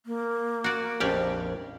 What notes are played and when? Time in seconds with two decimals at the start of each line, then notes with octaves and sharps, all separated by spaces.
0.06 A#3
0.64 F#4 D5
1.00 A#1 F2 C#4 D4 G4 D5